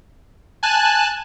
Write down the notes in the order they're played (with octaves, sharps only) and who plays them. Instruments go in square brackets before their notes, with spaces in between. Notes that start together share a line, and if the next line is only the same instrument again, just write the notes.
[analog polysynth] G#5 A5 F#6